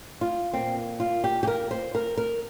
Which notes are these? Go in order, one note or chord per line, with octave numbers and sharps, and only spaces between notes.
F4
A#2 A#3 C4
F4
G4
G4
A#4
C5
A#4
A#4